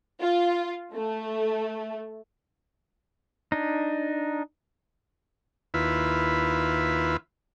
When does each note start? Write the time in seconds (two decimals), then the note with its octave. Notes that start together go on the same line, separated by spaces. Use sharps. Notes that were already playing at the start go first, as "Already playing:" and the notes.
0.20 F4
0.93 A3
3.52 D4 D#4
5.74 D#2 E4 F4 B4